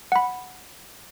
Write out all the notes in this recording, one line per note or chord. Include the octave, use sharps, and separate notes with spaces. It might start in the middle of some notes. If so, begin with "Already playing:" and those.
F#5 B5